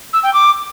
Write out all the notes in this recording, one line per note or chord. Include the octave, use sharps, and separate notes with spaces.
E6
G5
D6